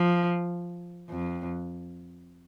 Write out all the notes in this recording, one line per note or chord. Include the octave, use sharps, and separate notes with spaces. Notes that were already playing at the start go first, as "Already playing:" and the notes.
Already playing: F3
F2